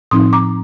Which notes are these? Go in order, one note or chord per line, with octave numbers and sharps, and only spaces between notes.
A2 F3 C4 D#4 C6 D#6
A#5 D6